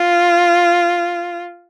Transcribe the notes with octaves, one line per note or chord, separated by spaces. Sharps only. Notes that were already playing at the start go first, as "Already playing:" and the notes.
Already playing: F4